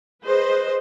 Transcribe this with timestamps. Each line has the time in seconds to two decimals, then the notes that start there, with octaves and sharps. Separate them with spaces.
0.25 G#4 B4 C5 D#5